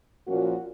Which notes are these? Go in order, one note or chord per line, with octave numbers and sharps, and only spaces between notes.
A#2 F3 A#3 C#4 F#4